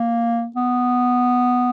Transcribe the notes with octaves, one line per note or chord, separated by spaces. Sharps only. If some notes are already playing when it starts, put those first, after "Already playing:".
Already playing: A#3
B3